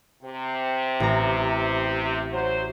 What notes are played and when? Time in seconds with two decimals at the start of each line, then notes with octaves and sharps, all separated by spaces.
0.23 C3
1.00 A1 A#5
2.32 F#3 C5